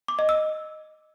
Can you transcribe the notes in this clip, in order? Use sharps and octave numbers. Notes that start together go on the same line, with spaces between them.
D6
D#5
E6